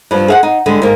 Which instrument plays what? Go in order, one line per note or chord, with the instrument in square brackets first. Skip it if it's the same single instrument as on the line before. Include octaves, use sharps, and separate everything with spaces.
[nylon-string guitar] G2 F3
G#4 F5 F#5
D#4
D3 G3 G#3
G#2 A#3